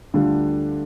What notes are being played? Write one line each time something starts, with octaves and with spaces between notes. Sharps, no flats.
D2 D3 G3 D4 F4